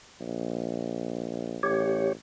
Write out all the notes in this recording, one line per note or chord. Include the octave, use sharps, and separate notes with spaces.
A#1
A1 G4 C#5